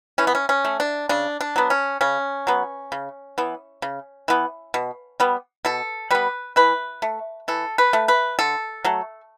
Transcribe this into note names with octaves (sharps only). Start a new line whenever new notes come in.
E3 C#4
B3
C#4
C#4
A3
D4
C#3 D4
D4
F#3 B3
C#4
C#3 C#4
F#3 B3
C#3
E3 B3
C#3
E3 B3
B2
G3 B3
B2 A4
G3 B3 B4
E3 B4
A3
E3 A4
B4
A3
B4
D3 A4
F#3 A3